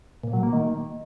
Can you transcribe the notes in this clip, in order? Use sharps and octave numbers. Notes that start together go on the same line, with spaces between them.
A#2
F#3
A#3
D#3